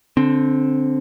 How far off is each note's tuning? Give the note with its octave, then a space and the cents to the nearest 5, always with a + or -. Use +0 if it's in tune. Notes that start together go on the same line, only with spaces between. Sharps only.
D3 -15 C4 +0